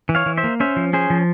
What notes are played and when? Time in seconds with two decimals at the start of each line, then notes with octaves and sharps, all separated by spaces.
0.09 E3
0.15 C#5 F5
0.26 E3
0.37 C5 E5
0.44 A#3
0.60 C#4 C5 E5
0.76 F3
0.93 C#4 G#4 C5
1.10 F3